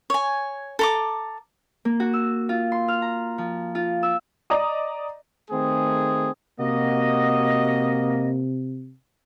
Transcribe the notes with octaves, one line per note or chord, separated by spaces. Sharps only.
C#5 G#5
A4 A#5 D6
A#3
F#4
E6
F4
C6
F6
A#5
F3
F4
E6
D5 D#5 A#5 D6 D#6
D#3 A3 C4 G#4
C3 A#3 F#4 D#5